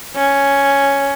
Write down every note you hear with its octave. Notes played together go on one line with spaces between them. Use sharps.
C#4